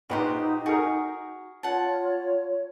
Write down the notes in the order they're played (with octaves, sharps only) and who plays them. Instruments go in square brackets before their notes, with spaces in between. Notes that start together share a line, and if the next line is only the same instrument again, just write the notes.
[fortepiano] A#1 A#3 B4 [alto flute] D#4 [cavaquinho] F#4 G4 C5
[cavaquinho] F#4 [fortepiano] G#4 A#4
[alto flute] F4 [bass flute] C#5 [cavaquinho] F#5 A5